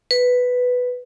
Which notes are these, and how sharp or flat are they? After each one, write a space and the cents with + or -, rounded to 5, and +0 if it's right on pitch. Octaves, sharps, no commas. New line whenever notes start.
B4 +5